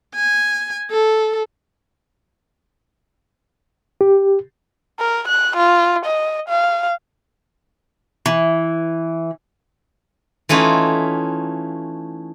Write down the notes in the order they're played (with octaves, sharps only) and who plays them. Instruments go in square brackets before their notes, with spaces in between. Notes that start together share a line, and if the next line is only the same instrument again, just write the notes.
[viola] G#5
A4
[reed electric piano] G4
[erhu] A#4
F#6
F4
D#5
F5
[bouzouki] E3
[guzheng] E3 A3 C#4 D#4 F4